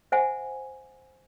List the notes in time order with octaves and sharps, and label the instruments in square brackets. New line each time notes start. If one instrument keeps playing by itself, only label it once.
[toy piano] C5 E5 F#5 G#5